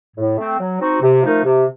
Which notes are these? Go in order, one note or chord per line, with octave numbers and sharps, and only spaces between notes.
A2
A3 C4
F#3
C4 D#4 F#4
C3
F3 A3 D#4 A#4
C3